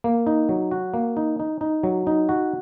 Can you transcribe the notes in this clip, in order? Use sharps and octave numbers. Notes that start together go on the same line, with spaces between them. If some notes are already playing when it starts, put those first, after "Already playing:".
A#3
D#4
F#3
F#4
A#3
D#4
D#4
D#4
F#3
D#4
F#4